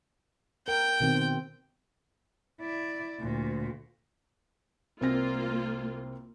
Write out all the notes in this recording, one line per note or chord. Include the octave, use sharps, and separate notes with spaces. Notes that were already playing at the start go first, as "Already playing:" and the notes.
A#4 G5
B2 D#3 C4
E4 D5
D2 A#2
C2 A#3 C4 F4 A#6